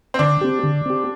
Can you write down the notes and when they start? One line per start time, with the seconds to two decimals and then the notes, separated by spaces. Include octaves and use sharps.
0.14 C4
0.19 D3 D4
0.41 C4 G4
0.63 D3
0.86 C4 G4